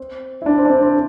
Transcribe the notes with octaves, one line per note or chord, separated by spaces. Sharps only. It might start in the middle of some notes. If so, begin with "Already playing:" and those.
Already playing: C4
E4
D4
C4
D4
C4
C4